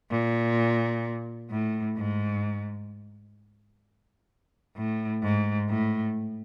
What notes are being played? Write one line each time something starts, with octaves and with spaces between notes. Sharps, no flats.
A#2
A2
G#2
A2
G#2
A2